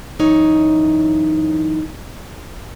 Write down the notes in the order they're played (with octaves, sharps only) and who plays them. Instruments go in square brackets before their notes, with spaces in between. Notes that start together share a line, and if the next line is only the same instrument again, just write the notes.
[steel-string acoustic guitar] F#2 E3 D#4 C#5